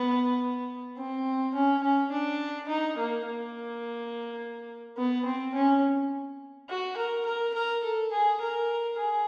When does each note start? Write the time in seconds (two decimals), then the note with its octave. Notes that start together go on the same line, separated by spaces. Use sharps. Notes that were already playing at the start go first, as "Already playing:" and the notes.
Already playing: B3
0.97 C4
1.54 C#4
1.83 C#4
2.11 D4
2.68 D#4
2.97 A#3
3.26 A#3
4.97 B3
5.25 C4
5.55 C#4
6.69 F#4
6.97 A#4
7.25 A#4
7.54 A#4
7.83 A4
8.12 G#4
8.41 A#4
8.97 G#4